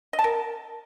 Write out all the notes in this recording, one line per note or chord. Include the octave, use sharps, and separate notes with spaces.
D#5
A5
A#4